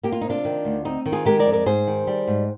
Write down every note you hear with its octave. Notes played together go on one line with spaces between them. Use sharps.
A#3 G4
F4
C3 D#4
D4 F4
D#3
D2
C4 D#4
D#3
F4 G#4
G#3 G4 A#4
A#4 D5
F2
A#4 D5
G#2 G#4 C5
D#3
G3
G#2